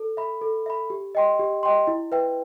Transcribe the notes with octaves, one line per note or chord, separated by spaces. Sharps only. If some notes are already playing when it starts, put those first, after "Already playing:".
Already playing: A4
E5 B5
A4
E5 B5
G4
D#5 G5 C6
G4
D#5 G5 C6
E4
B4 E5 G5